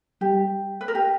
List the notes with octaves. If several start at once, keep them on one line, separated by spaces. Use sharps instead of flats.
G3 G4
B4
A#4
G4